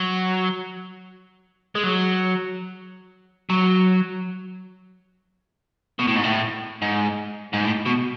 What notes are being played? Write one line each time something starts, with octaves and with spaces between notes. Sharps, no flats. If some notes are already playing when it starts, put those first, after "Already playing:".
Already playing: F#3
G#3
F#3
F#3
B2
A2
G#2
A2
G#2
G#2
A2
B2